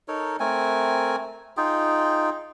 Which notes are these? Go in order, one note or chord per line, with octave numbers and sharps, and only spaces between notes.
D#4 A4 A#4 C#5
A3 C4 A#4 G#5
D#4 F4 G#4 G5